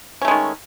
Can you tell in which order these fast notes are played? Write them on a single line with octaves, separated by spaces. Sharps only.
C#4 A3 G#3 D#3